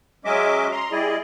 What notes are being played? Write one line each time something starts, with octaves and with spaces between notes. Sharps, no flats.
F#3 G#3 C#4 D#5 E5 D6
A#5 C6
G3 E4 G#4 D5 D#5